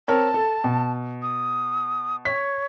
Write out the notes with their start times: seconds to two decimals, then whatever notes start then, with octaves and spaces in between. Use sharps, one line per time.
0.08 C4 A#4 C#5 A5
0.34 A4
0.64 B2
1.22 D#6
2.25 C#5 B6